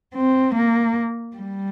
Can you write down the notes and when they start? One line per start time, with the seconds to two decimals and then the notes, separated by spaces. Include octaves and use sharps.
0.14 C4
0.54 A#3
1.36 G3